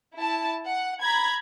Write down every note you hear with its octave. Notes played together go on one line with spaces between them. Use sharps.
E4 A5
F#5
A#5 B5 G#6